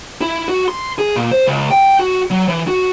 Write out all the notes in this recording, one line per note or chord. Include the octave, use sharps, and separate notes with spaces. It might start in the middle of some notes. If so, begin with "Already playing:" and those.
E4
F#4
C6
G#4
A#2
C5
C#2
G5
F#4
F#3
E3
F#4